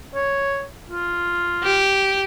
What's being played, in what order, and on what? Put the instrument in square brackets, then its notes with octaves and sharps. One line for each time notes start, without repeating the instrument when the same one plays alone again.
[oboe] C#5
F4
[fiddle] G4